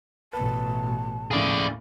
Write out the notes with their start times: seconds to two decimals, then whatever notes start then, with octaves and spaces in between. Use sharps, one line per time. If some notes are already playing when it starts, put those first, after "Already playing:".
0.33 A1 B2 B4 A5
1.31 D#2 A2 C#3 G#4 D5